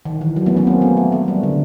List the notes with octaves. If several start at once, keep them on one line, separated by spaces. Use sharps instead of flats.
D#3
E3
F#3
A3 B3
B3 C#4
A#3 C4
A3 B3
A3
A3
G3
D3